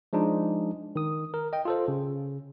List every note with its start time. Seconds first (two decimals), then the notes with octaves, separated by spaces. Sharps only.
0.13 F3 G#3 D4 D#4
0.96 D#3 D#6
1.34 A#4
1.53 D#5 G5
1.65 F4 A4 C5
1.88 C#3